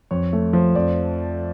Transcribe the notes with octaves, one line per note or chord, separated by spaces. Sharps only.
F2 C#5
A3
F3
F2 D5